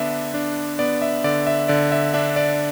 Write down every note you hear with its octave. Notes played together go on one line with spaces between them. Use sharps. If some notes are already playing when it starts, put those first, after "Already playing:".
Already playing: D3 B3 D4 E5
D4
B3 D5
E5
D3 D5
E5
D3 D5
E5
D4 E5
D5